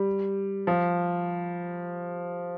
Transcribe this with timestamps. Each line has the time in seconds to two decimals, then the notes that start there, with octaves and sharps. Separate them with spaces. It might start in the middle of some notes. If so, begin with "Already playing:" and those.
Already playing: G3
0.67 F3